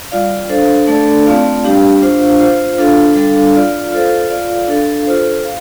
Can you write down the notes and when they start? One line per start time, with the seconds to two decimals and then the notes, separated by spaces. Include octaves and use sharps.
0.12 G3 F4 D5 F5
0.49 D4 A4 C5 F5
0.87 A3 D4 A4 D5
1.26 A3 C4 F4 D5 F5
1.64 G3 D4 G4 F5
2.02 D4 F4 C5 F5
2.39 F4 C5 F5
2.78 D4 F4 A4 F5
3.16 G3 D4 A4 F5
3.54 F4 D5 F5
3.92 F4 A4 C5 F5
4.30 F4 D5 F5
4.68 D4 A4 F5
5.07 F4 A4 C5
5.45 F5